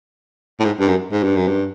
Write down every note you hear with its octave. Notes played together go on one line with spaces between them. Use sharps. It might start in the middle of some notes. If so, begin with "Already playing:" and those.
A2
G#2
G2
F#2
G#2
G2
F#2
G2